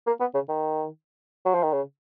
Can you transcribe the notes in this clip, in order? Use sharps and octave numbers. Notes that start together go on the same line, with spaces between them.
A#3
B3
C#3
D#3
F#3
F3
D#3
C#3